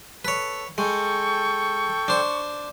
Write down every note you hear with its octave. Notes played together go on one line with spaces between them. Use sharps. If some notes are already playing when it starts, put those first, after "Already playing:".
A4 B4 C#5
G#3 A4 G5 C#6
D4 C5